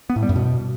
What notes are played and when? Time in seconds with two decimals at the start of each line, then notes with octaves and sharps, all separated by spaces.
0.10 B3
0.16 A2
0.23 G3
0.29 F#2
0.36 B2